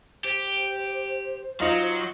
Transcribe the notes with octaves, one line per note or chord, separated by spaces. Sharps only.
G4 C5
F#3 D#4 F4